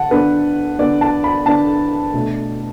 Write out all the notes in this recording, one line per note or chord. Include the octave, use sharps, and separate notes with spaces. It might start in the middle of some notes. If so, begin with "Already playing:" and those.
Already playing: D3 D4 F#5 A5
D3 B3 D4 B4
D3 B3 D4 D5
A5
B5
D3 B3 D4 A5
B2 A3 D4